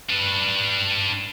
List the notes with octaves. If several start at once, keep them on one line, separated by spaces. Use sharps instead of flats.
D4 B4